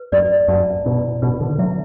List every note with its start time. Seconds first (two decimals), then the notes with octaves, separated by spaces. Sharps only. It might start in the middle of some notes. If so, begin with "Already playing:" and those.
Already playing: B4
0.12 F#2 D5
0.48 F#2 A5
0.85 B2 E4
1.22 B2 B4
1.41 D3
1.59 F#3 E5